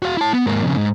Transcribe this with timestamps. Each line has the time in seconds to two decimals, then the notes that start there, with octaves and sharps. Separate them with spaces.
0.02 F#4 F5
0.17 E4 A5
0.33 B3
0.46 G#2 A#3
0.63 F2 C#3
0.76 G#2